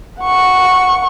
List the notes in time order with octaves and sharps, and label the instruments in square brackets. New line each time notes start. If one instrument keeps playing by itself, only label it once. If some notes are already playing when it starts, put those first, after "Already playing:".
[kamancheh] F#5 C#6